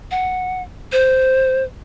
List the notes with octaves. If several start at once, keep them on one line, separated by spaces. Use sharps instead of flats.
F#5
C5